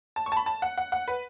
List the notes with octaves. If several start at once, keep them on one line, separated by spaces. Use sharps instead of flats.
A5
C#6
A5
B5
A5
F#5
F#5
F#5
B4